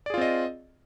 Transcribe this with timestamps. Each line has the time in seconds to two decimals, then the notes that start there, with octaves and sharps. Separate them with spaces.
0.06 D5
0.10 G#4
0.14 F4
0.18 C4
0.21 D#5